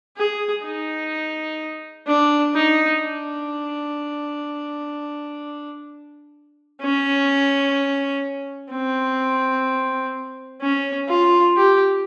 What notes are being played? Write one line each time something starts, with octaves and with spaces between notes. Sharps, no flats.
G#4
D#4
D4
D#4
D4
C#4
C4
C#4
F4
G4